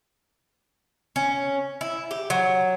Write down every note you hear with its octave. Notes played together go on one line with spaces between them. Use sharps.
C#4
E4
G4
F#3